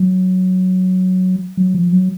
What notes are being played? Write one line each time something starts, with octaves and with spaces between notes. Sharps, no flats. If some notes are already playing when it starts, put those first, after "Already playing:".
Already playing: F#3
F#3
F3
F#3